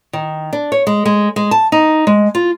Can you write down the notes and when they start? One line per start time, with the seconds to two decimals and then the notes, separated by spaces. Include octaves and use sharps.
0.13 D#3
0.53 D4
0.72 C#5
0.87 G#3
1.06 G#3
1.36 G#3
1.51 A5
1.72 D#4
2.07 G#3
2.35 F4